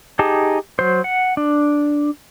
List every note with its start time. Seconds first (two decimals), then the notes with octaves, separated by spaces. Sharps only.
0.19 D#4 G4 G#4 A5
0.79 F#3 C5
1.04 F#5
1.37 D4